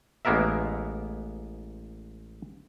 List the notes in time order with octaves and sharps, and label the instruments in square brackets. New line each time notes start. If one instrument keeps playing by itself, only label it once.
[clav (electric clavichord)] A1 G#3 A#3 B3 A#4 E5